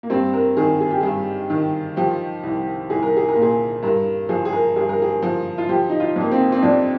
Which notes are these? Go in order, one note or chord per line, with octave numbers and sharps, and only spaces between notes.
A#3
G2 C4
A#4
D#3 G#4
G#4
G4
G2 G#4
D#3
F3 G4
C2
C2 G#4
A#4
G#4
A#4
A#2
G#4
G2 A#4
F3 G#4
G#4
A#4
G2 G#4
A#4
G#4
F3
F4
F3 G4
D#4
F4
F2 A#3
C4
C4
F2 D4